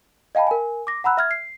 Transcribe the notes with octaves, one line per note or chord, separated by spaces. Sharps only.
D#5 F5 G5 A5 B5
A#4 G#5
D6 A#6
F#5 A#5 B5 E6 F#6
E5 F6 G#6
C7